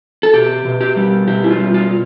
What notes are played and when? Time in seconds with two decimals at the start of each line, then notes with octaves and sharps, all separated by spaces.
0.23 A4
0.34 B2 G4
0.65 B2
0.81 G4
0.96 G3
1.27 B2 G4
1.44 E4
1.51 F4
1.58 G3
1.74 F4